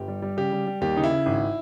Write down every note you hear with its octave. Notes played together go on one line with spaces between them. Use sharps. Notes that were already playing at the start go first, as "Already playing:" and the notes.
Already playing: G1 G4
G3
G3
C#3 G4
G3
G3
D#2 G4
C#3 D#4
E4
C#3
G#1